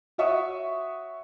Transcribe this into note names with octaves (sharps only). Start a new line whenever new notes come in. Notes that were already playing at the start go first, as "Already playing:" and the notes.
F#4 C#5 E5 F#5 C#6 D#6